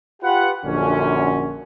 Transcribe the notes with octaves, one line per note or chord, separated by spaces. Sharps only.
F4 G4 B4 F#5
A#1 F#2 D3 C#4